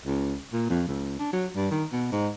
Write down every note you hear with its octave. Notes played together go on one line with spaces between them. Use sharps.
C#2
A#2
F2
C#2
D4
F#3
G2
D#3
B2
G#2